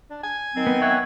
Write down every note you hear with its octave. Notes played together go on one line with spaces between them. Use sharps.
D4
G#5
D#3 F#3 C4
B3
C#5 E5 F#5 G#5